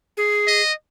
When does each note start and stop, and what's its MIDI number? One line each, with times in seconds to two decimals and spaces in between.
0.17 0.61 68
0.47 0.73 75